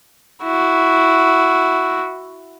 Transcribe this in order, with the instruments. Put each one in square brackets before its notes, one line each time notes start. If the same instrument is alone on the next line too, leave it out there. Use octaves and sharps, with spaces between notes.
[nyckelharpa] E4 F#4